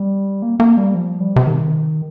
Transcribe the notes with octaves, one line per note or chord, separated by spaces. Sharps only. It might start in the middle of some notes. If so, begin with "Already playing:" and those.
Already playing: G3
A#3
A#3
G3
F3
G3
C3
D#3